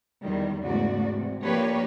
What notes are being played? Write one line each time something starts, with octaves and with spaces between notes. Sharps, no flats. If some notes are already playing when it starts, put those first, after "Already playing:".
E2 D#3 G3
E2 G#2 C#3 A3 F#4 D5
C3
F3 A#3 D4 G4 B4 C#5